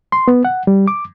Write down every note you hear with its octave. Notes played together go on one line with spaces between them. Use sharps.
C6
B3
F#5
G3
D6